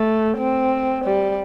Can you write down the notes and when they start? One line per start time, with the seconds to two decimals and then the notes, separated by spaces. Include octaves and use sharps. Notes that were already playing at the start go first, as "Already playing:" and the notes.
Already playing: A3
0.38 C4
1.05 G3